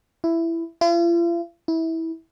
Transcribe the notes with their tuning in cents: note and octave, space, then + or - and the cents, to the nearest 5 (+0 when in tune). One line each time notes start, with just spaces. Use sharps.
E4 +10
F4 -45
E4 -20